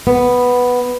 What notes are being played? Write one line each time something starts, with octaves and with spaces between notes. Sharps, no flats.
B3